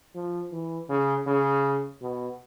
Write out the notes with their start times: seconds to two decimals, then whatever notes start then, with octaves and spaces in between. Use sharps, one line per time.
0.15 F3
0.52 E3
0.89 C#3
1.26 C#3
2.02 B2